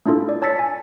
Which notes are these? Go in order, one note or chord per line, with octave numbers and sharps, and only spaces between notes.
A3 D4 E4 F4 A4
D5
C#5 A5 E6 A6 B6 C#7
G#5